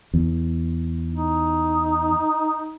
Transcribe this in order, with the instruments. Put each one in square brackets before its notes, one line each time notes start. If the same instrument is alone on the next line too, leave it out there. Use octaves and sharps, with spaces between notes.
[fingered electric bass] E2
[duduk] D#4